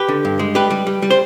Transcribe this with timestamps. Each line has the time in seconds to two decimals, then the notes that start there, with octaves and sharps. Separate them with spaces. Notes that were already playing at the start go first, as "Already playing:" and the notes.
Already playing: G4 B4
0.08 D3
0.25 G2
0.39 G#3
0.55 G3 G4 B4
0.70 G3
0.87 G3
1.02 G3
1.10 C5